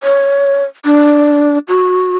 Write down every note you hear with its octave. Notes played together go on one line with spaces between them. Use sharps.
C#5
D4
F#4